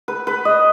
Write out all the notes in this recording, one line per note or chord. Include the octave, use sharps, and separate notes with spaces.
B4
B4
D#5